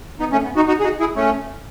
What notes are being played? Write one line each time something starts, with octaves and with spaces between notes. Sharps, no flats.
B3 D#4
A3 C#4
B3
D#4 F#4
D#4 F#4
G#4
D#4 F#4
E4 G#4
A3 C#4